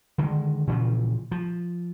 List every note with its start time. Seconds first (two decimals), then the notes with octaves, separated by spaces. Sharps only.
0.18 D3 D#3 G#3
0.67 A#2 C#3 E3 F3
1.31 F3